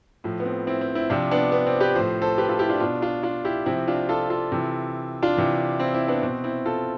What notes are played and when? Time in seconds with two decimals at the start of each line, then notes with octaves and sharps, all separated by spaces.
0.24 A2 F3
0.40 B3
0.46 C4
0.67 C4 E4
0.81 C4
0.95 C4 E4
1.10 C3 F3 D4 F4
1.31 B3 D4
1.52 B3
1.66 C4
1.81 G4 B4
1.95 A2 F3 C5
2.22 A4 C5
2.38 G4 B4
2.48 F4 A4
2.59 E4 G4
2.70 D4 F4
2.80 B2 D4 F4
3.02 D4 F4
3.23 D4 F4
3.45 E4 G4
3.66 C3 F3 C4 E4
3.88 D4 F4
4.09 F4 A4
4.30 F4 A4
4.52 C3 E3
5.23 D4 F4
5.37 C3 E3
5.80 C4 E4
5.94 C4 E4
6.08 B3 D4
6.22 B2 C4
6.44 C4 E4
6.65 F4 A4